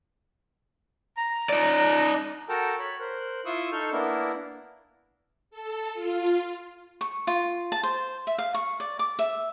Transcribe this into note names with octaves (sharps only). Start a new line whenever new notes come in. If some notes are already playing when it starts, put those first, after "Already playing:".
A#5
D#4 D5
F#4 A4 A#4 G5 A5 A#5
C#5 B5
A#4 C5 F#6
E4 F4 C6 C#6 D#6 E6
D#4 A4 C#6 F6 G6
A#3 B3 D4 E4 A#4
A4
F4
C#6
F4
A5
C5
E5
F5
C#6
D5
D6
E5